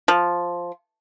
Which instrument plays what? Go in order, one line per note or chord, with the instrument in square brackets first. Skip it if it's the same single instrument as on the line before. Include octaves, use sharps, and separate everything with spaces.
[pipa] F3